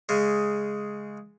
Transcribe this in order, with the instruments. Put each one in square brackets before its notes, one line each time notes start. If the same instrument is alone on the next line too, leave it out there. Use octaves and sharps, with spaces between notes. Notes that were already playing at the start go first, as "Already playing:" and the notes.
[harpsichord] C#3 G#3